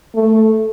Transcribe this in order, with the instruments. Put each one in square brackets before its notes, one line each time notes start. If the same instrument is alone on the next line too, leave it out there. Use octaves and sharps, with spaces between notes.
[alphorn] A3